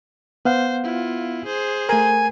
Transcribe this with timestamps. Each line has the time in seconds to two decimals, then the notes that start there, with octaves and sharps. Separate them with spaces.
0.45 B3 C5 F5 F#5
0.83 E4 F4
1.46 G#4 C5
1.89 A3 A#4 G#5